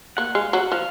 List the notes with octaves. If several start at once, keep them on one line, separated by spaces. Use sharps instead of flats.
A#3 F#5
G#3 F5
F#3 F#5
F3 F5